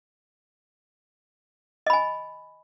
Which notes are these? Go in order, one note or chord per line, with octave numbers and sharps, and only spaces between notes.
D#5 G#5 B5